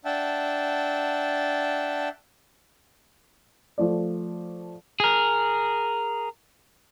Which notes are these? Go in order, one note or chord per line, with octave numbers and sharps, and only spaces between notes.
D4 E5 F#5 G5 A5
F3 A3 D5
G#4 A#4